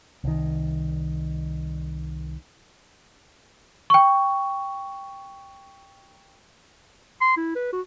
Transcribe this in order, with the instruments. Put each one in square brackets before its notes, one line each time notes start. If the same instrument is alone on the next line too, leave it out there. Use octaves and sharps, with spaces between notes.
[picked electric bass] C2 D#3
[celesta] G5 C#6
[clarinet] C6
E4
B4
F#4